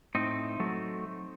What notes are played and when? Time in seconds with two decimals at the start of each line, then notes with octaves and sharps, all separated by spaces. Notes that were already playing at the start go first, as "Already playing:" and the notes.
0.15 A2 C4 D#4
0.60 F#3 A3